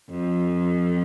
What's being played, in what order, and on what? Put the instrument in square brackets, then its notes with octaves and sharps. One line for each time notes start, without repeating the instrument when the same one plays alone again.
[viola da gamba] F2